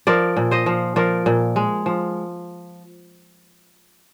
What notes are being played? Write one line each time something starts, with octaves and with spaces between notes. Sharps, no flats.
F3 A#4 D5
A#2
C5 D#5
F3
F3 A#4 D5
A#2
G#3
F3